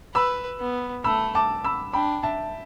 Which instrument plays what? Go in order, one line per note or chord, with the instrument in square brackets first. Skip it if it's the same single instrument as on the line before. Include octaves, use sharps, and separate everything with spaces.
[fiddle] B4 [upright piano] B5 E6
[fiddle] B3
[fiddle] A3 [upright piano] B5 E6
[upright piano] A5 D6
B5 E6
[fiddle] D4 [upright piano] G5 B5
[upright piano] E5 A5